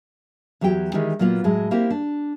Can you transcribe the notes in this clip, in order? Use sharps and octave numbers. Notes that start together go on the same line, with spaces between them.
E2 F#3 F#4 G4 G5
D#3 E3 G#3 E4 G4
A#2 F#3 A#3 B3 F4
A2 F#3 G#3
A#3 C4 E4 G4 A#4
D4